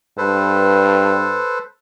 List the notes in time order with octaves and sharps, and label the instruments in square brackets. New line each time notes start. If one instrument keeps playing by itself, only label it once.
[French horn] G2 [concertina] A4 B4 C5